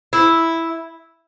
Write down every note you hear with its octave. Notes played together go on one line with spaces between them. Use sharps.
E4